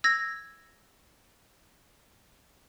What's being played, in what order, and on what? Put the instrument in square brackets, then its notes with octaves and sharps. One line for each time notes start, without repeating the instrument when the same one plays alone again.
[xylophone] E6 G#6 A#6